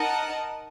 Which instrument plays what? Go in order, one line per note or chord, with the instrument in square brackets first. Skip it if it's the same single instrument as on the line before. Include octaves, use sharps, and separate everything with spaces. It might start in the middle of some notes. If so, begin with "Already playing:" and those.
Already playing: [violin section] D#4 A#4 D#5 F#5 A5